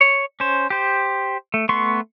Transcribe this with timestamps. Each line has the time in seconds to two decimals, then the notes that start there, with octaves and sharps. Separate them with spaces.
0.01 C#5
0.40 C#4 C5
0.70 G4 C5
1.54 A3
1.69 A3 B3 C6 C#6